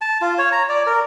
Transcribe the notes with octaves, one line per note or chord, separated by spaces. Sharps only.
A5
F4
C#5
A#5
D5
A#4